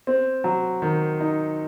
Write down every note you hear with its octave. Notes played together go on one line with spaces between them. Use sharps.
C4
F#3
D#3
D#4